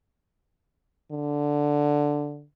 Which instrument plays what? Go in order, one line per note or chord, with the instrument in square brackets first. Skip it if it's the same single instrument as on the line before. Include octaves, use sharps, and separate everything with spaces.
[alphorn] D3